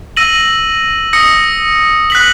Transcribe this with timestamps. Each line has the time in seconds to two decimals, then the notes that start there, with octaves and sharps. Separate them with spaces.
0.17 E6 A#6 D#7 F#7
1.13 D#6 A#6 C#7
2.10 F#6 B6 F#7